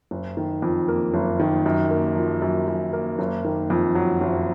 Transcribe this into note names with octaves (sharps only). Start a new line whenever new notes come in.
F#1
D#3
F2
A#3
F#1
D#3
F#2
A#3
F3
F#2
F#2
A#3
F#1
D#3
F2
F#3
F#1